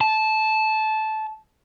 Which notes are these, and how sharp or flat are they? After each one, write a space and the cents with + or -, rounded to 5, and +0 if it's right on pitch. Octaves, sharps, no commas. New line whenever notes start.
A5 -15